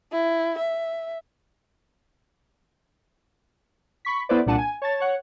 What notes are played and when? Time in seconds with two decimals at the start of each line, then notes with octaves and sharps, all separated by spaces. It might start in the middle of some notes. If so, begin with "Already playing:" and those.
0.12 E4
0.58 E5
4.05 B5 C#6 B6
4.29 B3 E4 A4 B4 C5 D5
4.46 C2 A#2 D4 F#5 A5 D#7
4.58 G#5
4.82 C#5 A5 A6
5.00 C#5 F#5